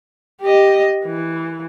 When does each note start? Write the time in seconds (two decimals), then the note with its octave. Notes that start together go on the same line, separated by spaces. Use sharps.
0.42 G4 D#5
1.05 E3